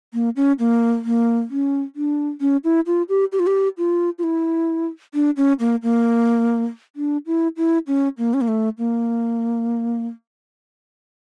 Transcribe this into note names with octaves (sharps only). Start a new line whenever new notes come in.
A#3
C#4
A#3
A#3
C#4
D4
C#4
E4
F4
G4
G4
F4
G4
F4
F4
E4
D4
C#4
A#3
A#3
D4
E4
E4
C#4
A#3
C#4
A#3
A3
A#3